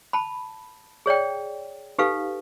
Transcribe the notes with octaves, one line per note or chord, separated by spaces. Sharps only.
A5 B5
G#4 C#5 D5 G5
D#4 G4 A4 B4 F5